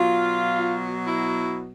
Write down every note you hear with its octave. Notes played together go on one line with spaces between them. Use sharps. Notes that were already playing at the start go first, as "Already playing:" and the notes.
Already playing: B2 F#3 F4
E4